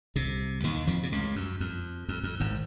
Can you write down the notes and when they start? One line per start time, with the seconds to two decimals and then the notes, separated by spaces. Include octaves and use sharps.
0.16 C2 C3
0.64 D#2 D#3
0.87 F2 F3
1.03 C3
1.12 C#2 C#3
1.36 F#2
1.60 F2
2.08 F2
2.23 F2
2.40 G#1 G#2